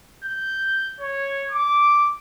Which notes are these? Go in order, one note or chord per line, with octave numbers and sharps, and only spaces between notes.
G6
C#5
D6